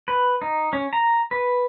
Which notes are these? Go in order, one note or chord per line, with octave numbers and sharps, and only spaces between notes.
B4
D#4
C#4
A#5
B4